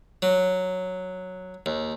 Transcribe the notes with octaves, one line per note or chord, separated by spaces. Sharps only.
F#3
D#2